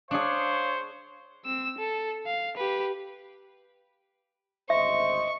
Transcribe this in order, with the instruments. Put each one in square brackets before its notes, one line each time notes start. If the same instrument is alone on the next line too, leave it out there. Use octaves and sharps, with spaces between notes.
[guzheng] D4 G#4 [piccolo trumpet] C5 [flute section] C#5 F5 [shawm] C#6
[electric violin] C4 E6
A4
F5
G4 B4
[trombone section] G#1 D2 C5 [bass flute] D#5 [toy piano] E5 [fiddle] C#6